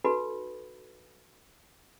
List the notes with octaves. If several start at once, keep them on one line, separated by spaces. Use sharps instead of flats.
D#4 F#4 A4 B4 B5